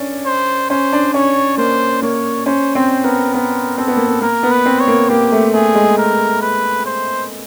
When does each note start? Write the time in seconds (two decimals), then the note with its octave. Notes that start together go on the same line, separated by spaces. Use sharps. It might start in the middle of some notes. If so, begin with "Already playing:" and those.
Already playing: C#4 D4
0.26 C5
0.70 C#4 C5
0.93 D4
1.14 C#4 C#5
1.57 A#3 C5
2.02 A#3 C#5
2.46 C#4 C5
2.75 C4 C5
3.04 B3 A#4
3.34 B3 A#4
3.78 C4 A4
3.87 B3
3.96 A#3
4.06 B3
4.22 A#3 A#4
4.43 B3
4.51 B4
4.66 C4
4.80 C#5
4.88 A#3
5.09 A#3 G4
5.32 A3
5.54 A3 G#4
5.75 G#3
5.97 A#4
6.41 B4
6.86 C5